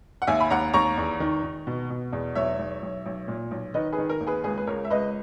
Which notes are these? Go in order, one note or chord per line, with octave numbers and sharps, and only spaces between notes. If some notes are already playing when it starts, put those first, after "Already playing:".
F#5
D#2 E5 G#5
B5
D#2 F#5 A#5
D#2 A#5 C#6
E2
D#3
D#3
B2
B2
E2
B1 C#5 E5
B1
B1
B1
A#2
B1
D#3 B4 D#5
G#4 B4
D#3
A#4
D#2
G#4 B4
C#2 G#4 B4
B4
C#2 A#4 C#5
E5
C#2 B4 D#5